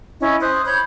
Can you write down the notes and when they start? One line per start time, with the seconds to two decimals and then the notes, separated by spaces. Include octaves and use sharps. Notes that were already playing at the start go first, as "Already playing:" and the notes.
0.20 C#4 E4 D#5
0.40 C5 D#6 F#6
0.65 C#5 B5 G6